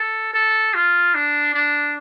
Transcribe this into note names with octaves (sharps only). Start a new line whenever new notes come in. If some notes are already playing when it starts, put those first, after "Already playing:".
Already playing: A4
A4
F4
D4
D4